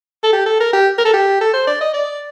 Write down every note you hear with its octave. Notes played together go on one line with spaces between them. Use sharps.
A4
G4
A4
A#4
G4
A#4
A4
G4
A4
C5
D5
D#5
D5